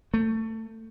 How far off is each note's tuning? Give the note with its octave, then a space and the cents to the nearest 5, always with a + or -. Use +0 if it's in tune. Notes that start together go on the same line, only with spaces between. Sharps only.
A3 +25